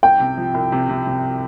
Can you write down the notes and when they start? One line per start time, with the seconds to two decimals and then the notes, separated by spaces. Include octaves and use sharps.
0.03 C2 G5
0.20 C3
0.37 F3
0.54 C2
0.72 C3
0.89 C3
1.07 C3